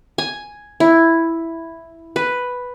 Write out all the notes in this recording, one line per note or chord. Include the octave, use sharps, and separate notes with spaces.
G#5
E4
B4